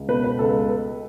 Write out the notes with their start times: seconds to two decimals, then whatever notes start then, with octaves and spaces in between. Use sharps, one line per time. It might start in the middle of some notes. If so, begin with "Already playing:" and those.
Already playing: C#2
0.08 B2 B4
0.24 B4
0.39 C#2 A4